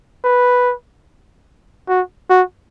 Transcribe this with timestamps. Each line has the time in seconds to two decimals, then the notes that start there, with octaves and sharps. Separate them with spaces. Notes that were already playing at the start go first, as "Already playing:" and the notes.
0.25 B4
1.89 F#4
2.30 F#4